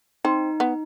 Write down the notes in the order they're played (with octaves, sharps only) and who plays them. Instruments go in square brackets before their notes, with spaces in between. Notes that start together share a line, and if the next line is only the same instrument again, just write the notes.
[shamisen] C4 [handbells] D#4
[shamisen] B3